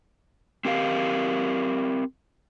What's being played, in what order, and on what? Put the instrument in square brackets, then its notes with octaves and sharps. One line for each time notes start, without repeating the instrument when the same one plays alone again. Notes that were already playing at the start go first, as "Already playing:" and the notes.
[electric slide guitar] C4 G4 A#4 F5